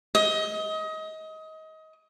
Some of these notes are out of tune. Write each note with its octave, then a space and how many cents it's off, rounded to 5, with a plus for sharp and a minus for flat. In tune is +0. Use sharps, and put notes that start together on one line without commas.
D#5 +25